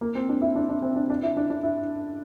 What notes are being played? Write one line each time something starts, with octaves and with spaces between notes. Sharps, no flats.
A#3
C4
D4
E4
D4
D4
C4
D4
D4
E4
D4
D4
E4